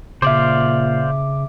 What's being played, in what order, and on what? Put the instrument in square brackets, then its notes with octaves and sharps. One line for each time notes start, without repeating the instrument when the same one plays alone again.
[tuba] A#2 [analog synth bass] C#3 [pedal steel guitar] C5 D5 F5 [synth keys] E5 D6